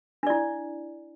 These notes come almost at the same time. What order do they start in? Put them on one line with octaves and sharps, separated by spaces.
D4 D5 E4